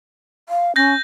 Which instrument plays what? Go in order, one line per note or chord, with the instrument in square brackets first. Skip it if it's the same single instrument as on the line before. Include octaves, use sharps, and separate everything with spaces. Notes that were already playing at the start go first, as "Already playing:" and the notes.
[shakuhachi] F5
[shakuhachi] C#4 [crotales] G6 A#6